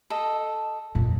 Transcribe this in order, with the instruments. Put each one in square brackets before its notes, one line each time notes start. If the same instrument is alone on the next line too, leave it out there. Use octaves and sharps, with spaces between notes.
[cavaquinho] A4 D#5
[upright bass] F2 [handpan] A#2